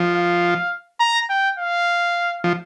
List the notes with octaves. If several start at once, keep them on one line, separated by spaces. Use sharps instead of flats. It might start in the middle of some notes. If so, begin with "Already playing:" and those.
Already playing: F3
F5
A#5
G5
F5
F3